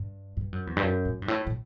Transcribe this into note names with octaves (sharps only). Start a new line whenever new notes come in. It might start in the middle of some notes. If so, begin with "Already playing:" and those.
Already playing: G2
G2
F#2
E2
G2
F#2
A2
G2
A2
A2